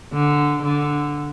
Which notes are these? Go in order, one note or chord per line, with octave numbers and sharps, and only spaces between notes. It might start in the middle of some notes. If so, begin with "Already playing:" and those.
D3
D3